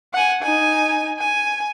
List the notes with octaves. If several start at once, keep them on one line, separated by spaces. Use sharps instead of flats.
F#5 G#5
D#4 G#5
G#5